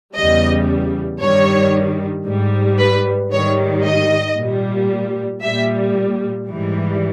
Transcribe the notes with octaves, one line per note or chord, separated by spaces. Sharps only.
E2 C#3 G3 D#5
G2 D#3 G3 C#5
G#2 G3
B4
G#2 D#3 G3 C#5
D#5
A#2 G3
A#2 G3 E5
G#2 E3 G3